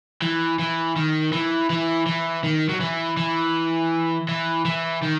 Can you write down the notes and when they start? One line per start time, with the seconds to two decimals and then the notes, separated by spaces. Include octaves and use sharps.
0.22 E3
0.59 E3
0.96 D#3
1.33 E3
1.70 E3
2.06 E3
2.44 D#3
2.69 F#3
2.80 E3
3.17 E3
4.29 E3
4.65 E3
5.02 D#3